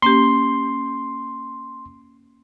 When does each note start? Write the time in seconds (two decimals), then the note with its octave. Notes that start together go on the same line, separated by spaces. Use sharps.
0.02 A#3 C#4 G4 C6